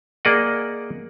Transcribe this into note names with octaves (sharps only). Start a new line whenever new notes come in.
A#3 G#4 D5 D#5 F#5